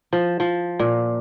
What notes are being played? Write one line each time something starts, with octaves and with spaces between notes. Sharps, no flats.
F3
F3
A#2